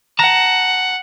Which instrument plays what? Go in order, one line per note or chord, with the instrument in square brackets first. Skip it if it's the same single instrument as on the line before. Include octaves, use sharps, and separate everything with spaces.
[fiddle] F#5 [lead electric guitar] A5 A#5